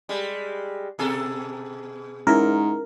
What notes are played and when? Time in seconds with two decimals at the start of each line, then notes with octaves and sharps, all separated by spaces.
0.09 G3 G#3
0.99 B2 G#4 A4
2.27 G#2 C#4 E4 A#4